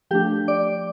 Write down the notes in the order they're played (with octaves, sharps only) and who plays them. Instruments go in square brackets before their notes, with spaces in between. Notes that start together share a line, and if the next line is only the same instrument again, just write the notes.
[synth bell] F3 A3 D4 G4 G5
D5 D6